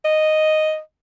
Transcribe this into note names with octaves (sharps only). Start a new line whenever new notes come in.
D#5